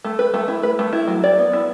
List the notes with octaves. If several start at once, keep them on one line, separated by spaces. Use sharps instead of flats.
A3
B4
A3
E4
B4
A3
E4
F#3
D5
B3
E4